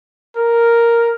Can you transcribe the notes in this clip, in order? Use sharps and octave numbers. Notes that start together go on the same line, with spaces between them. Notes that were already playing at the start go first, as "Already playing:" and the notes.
A#4